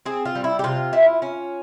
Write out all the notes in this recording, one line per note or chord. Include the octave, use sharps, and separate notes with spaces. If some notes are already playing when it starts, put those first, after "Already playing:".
C4 G#4
F4
G3
E4
G4
C3 F4
E4
C#4